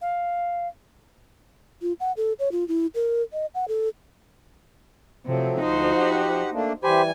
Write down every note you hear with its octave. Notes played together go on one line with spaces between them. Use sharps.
F5
F4
F#5
A4
C#5
F4
E4
A#4
D#5
F#5
A4
C3 F3 F#3 A3 C4
D2 D#4 F#4 C5
G4 F#5
A3 A#3 D4
E3 G3 G4 C5 G#5 B5